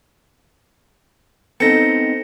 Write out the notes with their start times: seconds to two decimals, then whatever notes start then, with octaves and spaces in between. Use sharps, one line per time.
1.60 B3 C4 D#4 A4 G5 A#6 C#7